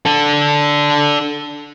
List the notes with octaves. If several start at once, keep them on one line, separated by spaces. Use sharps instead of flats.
D4 A4